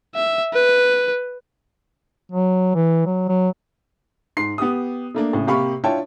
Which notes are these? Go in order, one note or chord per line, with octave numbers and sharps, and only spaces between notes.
E5
B4
F#3
E3
F#3
F#3
G#2 C6 C7
B3 G4 D#6
A3 A#3 D4
A2 C#3
C3 A#3 G4 F5 B5 C#6
D4 E4 F4 C#5 G5 A5